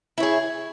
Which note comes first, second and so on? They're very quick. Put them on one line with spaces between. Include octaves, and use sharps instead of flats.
E4 C#5 G#4